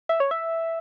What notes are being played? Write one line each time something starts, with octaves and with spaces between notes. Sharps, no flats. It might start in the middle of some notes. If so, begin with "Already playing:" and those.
E5
C#5
E5